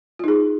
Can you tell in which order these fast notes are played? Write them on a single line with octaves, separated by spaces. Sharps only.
F4 D#4 G#4